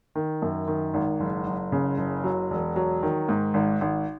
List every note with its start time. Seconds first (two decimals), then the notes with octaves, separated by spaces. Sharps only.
0.15 D#3
0.42 F#2
0.68 D#3
0.94 G#1
1.20 F#1
1.47 F#1
1.72 C#3
1.98 F#1
2.24 F#3
2.51 E1
2.76 F#3
3.03 D#3
3.29 G#2
3.54 G#1
3.81 G#1